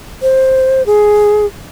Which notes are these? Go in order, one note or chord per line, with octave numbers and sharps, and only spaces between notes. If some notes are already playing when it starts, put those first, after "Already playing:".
C5
G#4